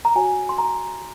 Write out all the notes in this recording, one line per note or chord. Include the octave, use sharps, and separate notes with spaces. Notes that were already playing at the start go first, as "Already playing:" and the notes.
A#5
F#4 C#5 G#5
C6
A#5